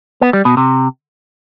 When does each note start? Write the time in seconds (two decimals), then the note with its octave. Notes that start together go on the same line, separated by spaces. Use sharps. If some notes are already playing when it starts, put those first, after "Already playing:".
0.21 B3
0.33 G3
0.45 B2
0.57 C3